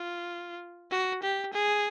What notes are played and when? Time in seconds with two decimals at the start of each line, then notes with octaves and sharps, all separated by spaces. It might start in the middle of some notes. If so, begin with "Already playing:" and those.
Already playing: F4
0.91 F#4
1.23 G4
1.53 G#4